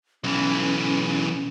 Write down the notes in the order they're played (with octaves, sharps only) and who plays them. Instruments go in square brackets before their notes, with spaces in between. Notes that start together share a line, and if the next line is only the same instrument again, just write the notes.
[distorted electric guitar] B1 E3 [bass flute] C#4